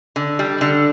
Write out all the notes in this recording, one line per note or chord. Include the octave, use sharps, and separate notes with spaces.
D3
G3
D3